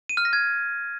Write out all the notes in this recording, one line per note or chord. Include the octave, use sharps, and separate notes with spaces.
D#7
F6
A#6
G#6